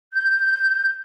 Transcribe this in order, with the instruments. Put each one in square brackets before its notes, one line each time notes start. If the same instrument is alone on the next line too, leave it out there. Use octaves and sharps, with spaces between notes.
[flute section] G6